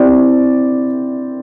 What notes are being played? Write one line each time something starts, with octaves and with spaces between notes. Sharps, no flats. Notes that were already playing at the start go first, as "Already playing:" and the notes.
Already playing: C4 E4 G4 D5